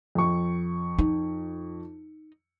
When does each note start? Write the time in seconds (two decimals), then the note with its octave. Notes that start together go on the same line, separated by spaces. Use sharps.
0.15 F2 C#6
0.99 D#4